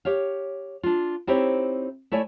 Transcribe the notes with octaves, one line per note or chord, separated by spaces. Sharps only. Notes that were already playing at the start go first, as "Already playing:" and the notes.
G4 C#5 F5
D4 F4
C4 D#4 E4 G4 C5 C#5
A3 E4 C#5 D5 G#5